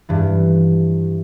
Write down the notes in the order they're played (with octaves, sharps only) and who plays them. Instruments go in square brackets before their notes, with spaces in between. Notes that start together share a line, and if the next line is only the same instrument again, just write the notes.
[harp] G2 E3